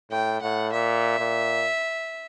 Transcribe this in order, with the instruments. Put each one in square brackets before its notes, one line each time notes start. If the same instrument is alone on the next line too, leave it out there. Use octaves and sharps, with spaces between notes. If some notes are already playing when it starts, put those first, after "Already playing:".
[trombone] A2 [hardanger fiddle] G5
[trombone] A2 [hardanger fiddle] F#5
[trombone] A#2 [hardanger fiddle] E5
[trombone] A#2